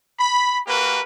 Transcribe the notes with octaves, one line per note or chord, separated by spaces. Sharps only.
B5
A#3 F#4 G4 A#4 B4